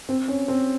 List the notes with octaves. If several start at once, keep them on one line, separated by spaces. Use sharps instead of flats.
C4
C#4
C4